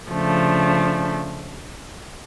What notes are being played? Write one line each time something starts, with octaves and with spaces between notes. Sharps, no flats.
C#3 F3 A3 D4